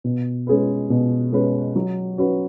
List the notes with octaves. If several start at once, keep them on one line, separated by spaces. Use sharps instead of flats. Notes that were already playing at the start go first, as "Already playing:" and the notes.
B2
G#3 C#4 G#4 B4
B2
G#3 C#4 G#4 B4
F#3
C#4 F#4 B4